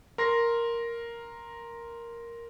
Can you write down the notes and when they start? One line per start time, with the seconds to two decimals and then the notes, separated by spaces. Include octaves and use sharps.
0.18 A#4 C6 A#6